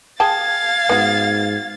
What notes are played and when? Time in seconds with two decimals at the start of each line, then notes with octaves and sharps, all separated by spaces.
0.20 G#4 F5 G5 A5 G#6 A6
0.89 G#2 B3 F#4